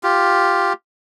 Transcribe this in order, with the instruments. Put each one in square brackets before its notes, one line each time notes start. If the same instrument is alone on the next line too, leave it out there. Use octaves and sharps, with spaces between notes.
[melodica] F4 G4